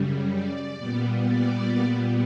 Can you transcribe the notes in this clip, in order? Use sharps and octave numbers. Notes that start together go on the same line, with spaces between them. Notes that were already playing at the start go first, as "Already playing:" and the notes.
Already playing: F#2 C#3 G3
D5
A#2 G3 B3
D5